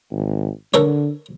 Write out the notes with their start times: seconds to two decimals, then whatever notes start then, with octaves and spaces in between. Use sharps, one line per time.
0.12 G#1
0.74 D3 A4 A#4 C#5